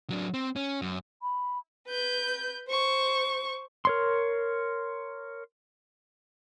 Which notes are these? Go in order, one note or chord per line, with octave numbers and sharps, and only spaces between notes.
F#3 D4
C4
C#4
F#2
B5
B4 G6
C5 C#6
A#4 C#5 C6